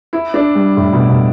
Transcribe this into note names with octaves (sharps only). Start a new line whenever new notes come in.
E4
D4
G3
A2
B2
B2